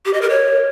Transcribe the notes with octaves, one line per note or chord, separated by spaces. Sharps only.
G4
D#5
A#4
C#5